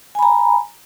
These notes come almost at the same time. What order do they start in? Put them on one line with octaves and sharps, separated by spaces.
G#5 B5 A#5